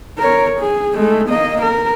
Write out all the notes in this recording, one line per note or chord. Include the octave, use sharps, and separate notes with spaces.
A#4 C#5
G#4
G#3 A3
A#3 D#5
A#4